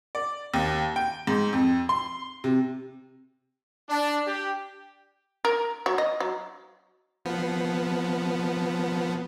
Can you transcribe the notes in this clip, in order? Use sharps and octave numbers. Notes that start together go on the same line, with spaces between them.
D5
D#2
G5
G#2
F2
C6
C3
D4
G4
A#4
F#3
D#5
F#3
F3 B3